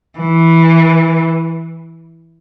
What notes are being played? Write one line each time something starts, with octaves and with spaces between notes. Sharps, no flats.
E3